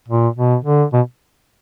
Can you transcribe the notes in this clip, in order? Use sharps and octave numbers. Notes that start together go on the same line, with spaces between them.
A#2
B2
D3
B2